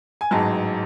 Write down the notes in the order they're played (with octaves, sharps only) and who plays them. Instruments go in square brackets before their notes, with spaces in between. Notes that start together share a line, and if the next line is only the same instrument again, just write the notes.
[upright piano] G#5
A1 G#2 F#3 A5